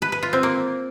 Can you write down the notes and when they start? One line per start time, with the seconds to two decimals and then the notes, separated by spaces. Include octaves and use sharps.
0.02 B4
0.12 B4
0.23 F4
0.33 C4
0.43 A#3